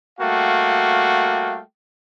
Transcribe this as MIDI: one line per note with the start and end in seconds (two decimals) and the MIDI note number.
0.20 1.61 55
0.20 1.61 57
0.20 1.61 58
0.20 1.61 66
0.20 1.61 77
0.20 1.61 79